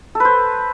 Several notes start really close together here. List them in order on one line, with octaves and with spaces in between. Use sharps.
A4 B4 C5